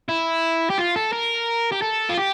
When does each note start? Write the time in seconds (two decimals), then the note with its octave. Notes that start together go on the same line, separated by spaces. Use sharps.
0.09 E4
0.70 G4
0.78 F4
0.96 A4
1.12 A#4
1.72 G4
1.82 A4
2.09 F4
2.18 G4